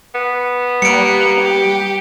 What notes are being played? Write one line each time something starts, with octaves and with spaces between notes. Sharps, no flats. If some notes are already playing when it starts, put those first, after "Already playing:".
B3
G3 A#3 C#7 D7
G4